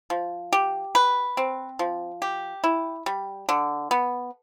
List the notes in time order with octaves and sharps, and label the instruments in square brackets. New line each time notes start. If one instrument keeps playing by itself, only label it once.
[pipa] F3
G4
B4
C4
F3
G4
E4
G3
D3
B3